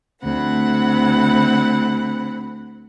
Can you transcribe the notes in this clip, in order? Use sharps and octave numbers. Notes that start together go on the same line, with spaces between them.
D2 C4 F#5 B5